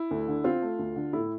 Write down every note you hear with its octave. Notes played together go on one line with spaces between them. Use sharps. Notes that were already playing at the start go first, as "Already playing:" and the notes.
Already playing: E4
D2
D3
C4 F4
A3
D2
D3
A2 E4